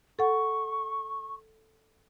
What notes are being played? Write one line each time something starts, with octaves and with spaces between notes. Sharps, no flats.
A4 F#5 C#6